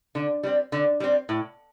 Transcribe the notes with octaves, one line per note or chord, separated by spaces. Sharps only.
D3
G3 C4
D3
G3 C4
A2